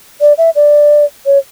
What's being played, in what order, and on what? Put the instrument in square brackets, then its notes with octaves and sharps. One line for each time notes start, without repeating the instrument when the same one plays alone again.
[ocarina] D5
E5
D5
C#5